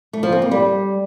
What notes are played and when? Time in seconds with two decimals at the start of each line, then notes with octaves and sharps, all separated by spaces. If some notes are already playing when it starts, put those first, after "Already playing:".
0.13 A3
0.23 F3
0.32 C4
0.42 A#3
0.51 G3